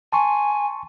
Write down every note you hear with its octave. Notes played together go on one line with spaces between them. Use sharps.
G#5 A5 C6 C#6